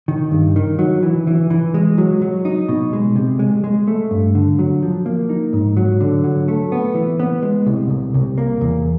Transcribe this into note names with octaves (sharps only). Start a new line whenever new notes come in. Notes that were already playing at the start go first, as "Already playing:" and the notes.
D#3
G2
D#3
F#3
E3
E3
E3
G#3
F#3
F#3
D#4
B2
G#3
C3
G#3
G#3
A3
G2
D3
F#3
F3
A#3
D#4
G#2
F#3
D3
F#3
A3
B3
E3
B3
G#3
C2
C2
C2
A#3
E2